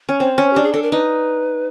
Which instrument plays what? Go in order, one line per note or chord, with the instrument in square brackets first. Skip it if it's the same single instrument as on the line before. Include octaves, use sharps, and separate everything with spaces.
[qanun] C#4
[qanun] C4 [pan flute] C5
[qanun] C#4
[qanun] D4 [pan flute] G4
[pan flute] G#4
[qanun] D4 [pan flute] A4
[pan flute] A#4
[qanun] D#4 [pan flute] B4